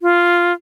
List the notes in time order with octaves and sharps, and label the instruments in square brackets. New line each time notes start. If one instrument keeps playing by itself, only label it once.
[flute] F4